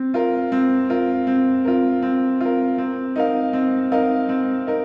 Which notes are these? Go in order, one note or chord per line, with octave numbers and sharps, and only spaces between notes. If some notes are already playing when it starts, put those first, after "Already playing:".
Already playing: C4
F4 A#4
C4
F4 A#4
C4
F4 A#4
C4
F4 A#4
C4
D#4 A#4 F5
C4
D#4 A#4 F5
C4
D#4 A#4